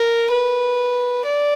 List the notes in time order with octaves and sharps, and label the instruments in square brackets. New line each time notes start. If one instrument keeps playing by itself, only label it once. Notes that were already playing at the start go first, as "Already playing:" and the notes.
Already playing: [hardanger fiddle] A#4
B4
D5